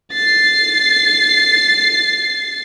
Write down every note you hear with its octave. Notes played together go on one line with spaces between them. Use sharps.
A6 C7